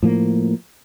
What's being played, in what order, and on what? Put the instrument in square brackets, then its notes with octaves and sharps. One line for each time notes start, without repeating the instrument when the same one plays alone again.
[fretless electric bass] A2 F3 A#3